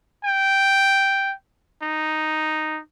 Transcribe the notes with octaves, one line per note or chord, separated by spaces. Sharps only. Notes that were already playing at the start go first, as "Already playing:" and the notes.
G5
D#4